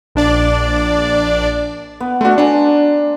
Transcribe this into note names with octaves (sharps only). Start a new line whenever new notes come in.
A#1 D4 D5
B3
A3 D4 F#4 C6
D4 F#5 G#5 A#5